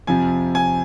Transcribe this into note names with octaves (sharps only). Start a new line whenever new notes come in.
F2 C3 F3 G#5
G#5